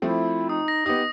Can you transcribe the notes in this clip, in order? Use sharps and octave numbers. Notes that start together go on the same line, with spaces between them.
F3 A3 C4 E4
D#4 D#6
A#6
B3 D#4 G4 D#6